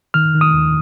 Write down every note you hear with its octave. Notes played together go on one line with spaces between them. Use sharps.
D#3 F6
D#3
D#6
D#2